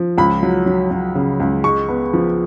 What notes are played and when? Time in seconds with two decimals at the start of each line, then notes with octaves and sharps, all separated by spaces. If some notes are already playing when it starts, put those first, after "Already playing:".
Already playing: F3
0.18 C#2 B5
0.43 F#3
0.66 F#3
0.91 F#3
1.15 C#3
1.40 C#2
1.64 G#3 C#6
1.89 B3
2.13 F3